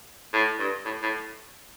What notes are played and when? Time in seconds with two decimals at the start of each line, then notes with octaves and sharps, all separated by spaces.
0.34 A2
0.59 G2
0.85 A2
1.03 A2